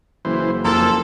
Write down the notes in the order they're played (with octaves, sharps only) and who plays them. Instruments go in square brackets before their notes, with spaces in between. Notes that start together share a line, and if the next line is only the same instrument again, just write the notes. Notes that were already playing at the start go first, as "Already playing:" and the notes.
[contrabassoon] F#1 [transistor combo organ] E3 C5
[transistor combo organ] F2 A#3 E6 [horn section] A#2 A4